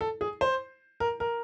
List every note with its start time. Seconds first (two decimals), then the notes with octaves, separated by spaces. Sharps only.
0.01 A4
0.21 G#4
0.41 C5
1.00 A#4
1.20 A#4